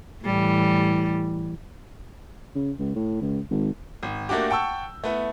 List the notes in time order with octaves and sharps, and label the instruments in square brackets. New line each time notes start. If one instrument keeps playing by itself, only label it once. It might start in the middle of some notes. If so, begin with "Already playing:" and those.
[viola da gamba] A2 E3 G3
[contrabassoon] C#3
C#2
A2
C#2
G#1
[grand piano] G#1
A3 A#3 D4 F#4 G4
F#5 G5 A5 C#6 E6
A3 B3 E4